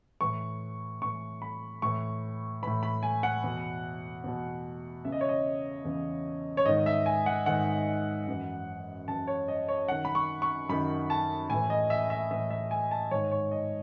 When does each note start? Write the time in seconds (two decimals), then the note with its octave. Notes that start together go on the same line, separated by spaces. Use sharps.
0.21 A2 E3 C#6
1.02 A2 E3 C#6
1.42 B5
1.82 A2 E3 C#6
2.62 A2 E3 B5
2.83 B5
3.03 G#5
3.23 F#5
3.44 E2 B2
4.24 E2 B2
5.05 E2 C#3 E3 E5
5.12 D#5
5.21 C#5
5.29 D#5
5.85 E2 C#3 E3
6.57 C#5
6.65 G#2 D#3 D#5
6.86 E5
7.06 G#5
7.26 F#5
7.46 G#2 D#3 F#5
8.27 F#2 E3
9.08 F#2 E3 A5
9.27 C#5
9.48 D#5
9.68 C#5
9.88 F#2 D#3 F#5
10.05 B5
10.15 C#6
10.42 C#6
10.69 F#2 D#3 B5
11.10 A5
11.50 A2 E3 G#5
11.70 D#5
11.90 E5
12.10 E5
12.31 A2 E3 E5
12.50 E5
12.71 G#5
12.91 A5
13.11 G#2 D#3 C#5
13.31 C#5
13.52 D#5